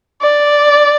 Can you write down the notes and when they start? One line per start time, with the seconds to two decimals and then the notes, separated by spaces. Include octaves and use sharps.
0.22 D5